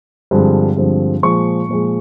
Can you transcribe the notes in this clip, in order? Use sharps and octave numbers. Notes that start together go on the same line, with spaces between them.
G2 D3 F3 G#3 C4
G2 D3 F3 G#3 C4
A#2 F3 G#3 C#6
A#2 F3 G#3